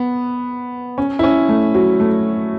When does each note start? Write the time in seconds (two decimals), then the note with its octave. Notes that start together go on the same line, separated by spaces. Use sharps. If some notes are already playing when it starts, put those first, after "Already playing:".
Already playing: B3
0.98 C#4
1.19 E4
1.23 C#4
1.49 A3
1.75 F#3
2.00 A3